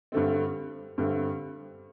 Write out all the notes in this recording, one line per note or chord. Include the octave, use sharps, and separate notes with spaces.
G2 D3 A3 C4
G2 D3 A3 C4